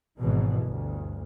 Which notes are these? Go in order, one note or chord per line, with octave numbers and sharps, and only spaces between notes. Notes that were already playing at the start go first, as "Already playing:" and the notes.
G#1 G#2 B2 E3
G1 D2